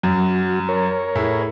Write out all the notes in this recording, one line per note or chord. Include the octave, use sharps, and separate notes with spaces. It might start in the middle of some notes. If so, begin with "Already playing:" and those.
F#2 F#3
A#4 C#5
A2 E4 G#4